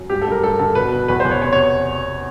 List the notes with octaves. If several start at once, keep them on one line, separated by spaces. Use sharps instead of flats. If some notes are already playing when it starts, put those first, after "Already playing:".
Already playing: F#2
G2 G4
A4
G2 A#4
G2 A4
D3 A4
B2 B4
B2
E2 B4
C5
E2
C#5
C3 C#5
C#5